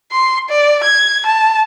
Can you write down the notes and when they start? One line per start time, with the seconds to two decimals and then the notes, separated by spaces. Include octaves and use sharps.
0.11 C6
0.49 D5
0.83 G#6
1.26 A5